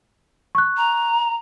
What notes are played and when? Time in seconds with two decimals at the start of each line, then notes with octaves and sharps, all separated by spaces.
0.55 C#6 F#6
0.77 A#5